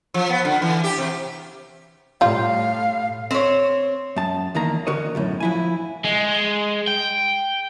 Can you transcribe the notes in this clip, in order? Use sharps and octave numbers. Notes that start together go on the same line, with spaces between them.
F3
B3
D3
E3
G4
C3
A2 G3 F4 F5
C4 C#5
F#2 A5
E2 D#3 A#3 A#5
D3 F#4 A#4 C#5 D#5
B1 F#2 A2
F3 E4 G#5
G#3
G5